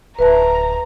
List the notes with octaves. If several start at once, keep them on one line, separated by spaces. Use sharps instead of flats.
D1 B4 E5 A5 A#5